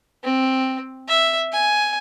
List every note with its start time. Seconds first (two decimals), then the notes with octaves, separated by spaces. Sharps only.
0.24 C4
1.08 E5
1.52 G#5